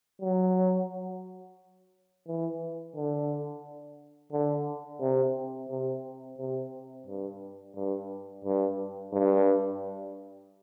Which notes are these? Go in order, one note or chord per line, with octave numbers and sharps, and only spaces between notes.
F#3
E3
D3
D3
C3
C3
C3
G2
G2
G2
G2